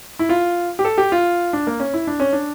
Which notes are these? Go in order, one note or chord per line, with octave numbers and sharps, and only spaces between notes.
E4
F4
G4
A4
G4
F4
D4
A#3
C#4
E4
D4
C#4
D4